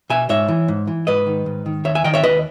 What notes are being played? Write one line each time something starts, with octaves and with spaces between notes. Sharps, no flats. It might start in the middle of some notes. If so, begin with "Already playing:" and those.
B2 E5 G#5
G#2 C#5 E5
E3
G#2
E3
G#2 B4 D#5
D#3
G#2
D#3
D#2 C#5 E5
E5 G#5
D#3 D#5 G5
C#5 E5
D#2 B4 D#5